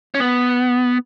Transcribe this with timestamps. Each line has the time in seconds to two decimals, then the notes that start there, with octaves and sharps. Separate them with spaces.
0.14 C#4
0.20 B3